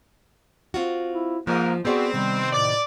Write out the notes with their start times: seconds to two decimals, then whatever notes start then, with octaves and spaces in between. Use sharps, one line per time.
0.74 C4 F4 F#4
1.12 E4
1.47 G#2 F3 A#3 A#4
1.85 B3 C4 F#4 G#4 D5
2.14 C3 D#3 G3 B3
2.53 A2 D5